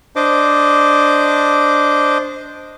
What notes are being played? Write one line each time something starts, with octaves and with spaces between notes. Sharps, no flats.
D4 C5 D#5 D6